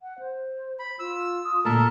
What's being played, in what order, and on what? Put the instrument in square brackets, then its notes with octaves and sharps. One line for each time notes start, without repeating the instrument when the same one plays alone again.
[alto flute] F#5
C5
[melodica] B5
[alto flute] F4 [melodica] E6
[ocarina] D#6
[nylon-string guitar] D2 A#2 [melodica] A4 A#4 A5 [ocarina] A#5